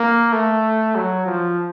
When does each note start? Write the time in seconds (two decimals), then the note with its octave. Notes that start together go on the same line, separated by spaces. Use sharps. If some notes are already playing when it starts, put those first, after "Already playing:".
Already playing: A#3
0.32 A3
0.95 F#3
1.26 F3